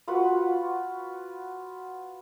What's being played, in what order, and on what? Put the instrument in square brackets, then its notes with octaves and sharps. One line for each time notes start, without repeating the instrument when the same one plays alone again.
[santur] F4 F#4 B4 F#5